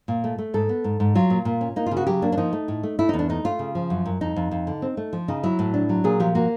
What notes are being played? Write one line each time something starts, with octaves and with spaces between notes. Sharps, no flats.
A#2
A3
A3
G#2 A4
B3
G#2
G#2
F#3 F4
A#2
A#2
C#4
A#3 D#4
F4
C#3
F#4
F#3 G4
A#3 D4
D4
F3 D#4
A3
A2
A3
A3 E4
D#4
E2
D4
A3 D#4
A3 F4
C#3
F3
F#2
F#2
F2 D#4
F2
F2
D3
C4
A3
F3
C#3 D#4
F#3 E4
A2
D4
F#3
A#2 G#4
F3 G4
A#3 F#4